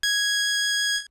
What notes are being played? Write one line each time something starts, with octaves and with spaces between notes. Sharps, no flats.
G#6